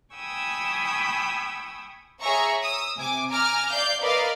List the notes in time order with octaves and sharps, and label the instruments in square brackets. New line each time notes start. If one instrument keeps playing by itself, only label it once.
[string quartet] G5 G#5 B5 C#6 D#6 E6
[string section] G#4 C#5 E5 G#5 A#5 C#6
D#6 E6
C3 G#5 D6
G#5 A#5 D6 F6
D5 F5 G6
A#4 B4 D5 D#5 F5